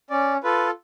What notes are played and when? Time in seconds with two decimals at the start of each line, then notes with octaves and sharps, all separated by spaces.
0.10 C#4 D5
0.44 F4 A4 B4